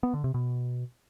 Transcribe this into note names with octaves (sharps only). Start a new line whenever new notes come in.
B3
D3
C3
B2